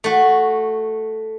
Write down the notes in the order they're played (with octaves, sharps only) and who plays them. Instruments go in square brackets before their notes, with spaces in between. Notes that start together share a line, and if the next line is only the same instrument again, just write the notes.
[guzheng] A3 F#4